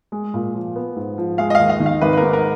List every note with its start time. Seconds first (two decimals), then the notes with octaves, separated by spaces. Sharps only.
0.12 G#3
0.34 A#2
0.54 F3
0.76 B3
0.96 G#2
1.18 F3
1.38 G#3 F5
1.50 D#5
1.55 D#2 F5
1.70 F5
1.80 D#3
1.86 F5
2.01 G#1 B4
2.13 B4
2.17 G#2 A#4
2.33 A#4